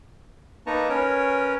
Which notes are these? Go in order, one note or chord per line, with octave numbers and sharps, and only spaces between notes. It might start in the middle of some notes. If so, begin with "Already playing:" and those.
A#3 D#4 B4 A5 A#5 C#6
C#4 A#4 B4 C#5